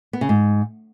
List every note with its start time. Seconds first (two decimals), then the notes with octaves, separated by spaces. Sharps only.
0.13 B3
0.21 C#3
0.29 G#2